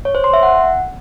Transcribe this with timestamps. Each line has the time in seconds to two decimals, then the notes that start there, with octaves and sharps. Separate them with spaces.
0.05 C#5
0.15 C5
0.24 C6
0.33 E5
0.43 F#5